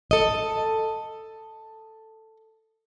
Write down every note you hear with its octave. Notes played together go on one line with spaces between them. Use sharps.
A4 D#5